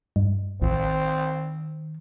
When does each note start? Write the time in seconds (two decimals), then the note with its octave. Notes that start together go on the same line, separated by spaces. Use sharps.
0.16 G2
0.62 A1 D#3 C4